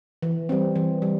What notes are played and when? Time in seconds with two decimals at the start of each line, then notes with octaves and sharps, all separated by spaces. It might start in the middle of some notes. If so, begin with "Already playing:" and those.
0.23 E3
0.49 G3 C4
0.76 E3
1.02 G3